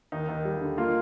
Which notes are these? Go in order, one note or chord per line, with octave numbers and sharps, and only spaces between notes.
D#2 D#4
D#2
G3
D3
A#3 F4